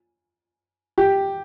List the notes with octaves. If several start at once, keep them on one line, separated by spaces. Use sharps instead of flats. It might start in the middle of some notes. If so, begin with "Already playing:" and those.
G4